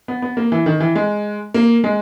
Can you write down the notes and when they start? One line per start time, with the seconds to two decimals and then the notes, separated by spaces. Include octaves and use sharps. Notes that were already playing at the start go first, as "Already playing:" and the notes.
0.08 B3
0.22 B3
0.37 A#3
0.52 E3
0.66 D#3
0.80 E3
0.96 G#3
1.54 A#3
1.84 G#3